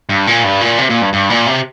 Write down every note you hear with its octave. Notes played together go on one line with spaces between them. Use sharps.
G2
A#2
G2
A#2
C3
A#2
G2
G2
A#2
C3